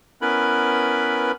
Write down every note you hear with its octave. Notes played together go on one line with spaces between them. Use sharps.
B3 C#4 E4 A#4 B4 B5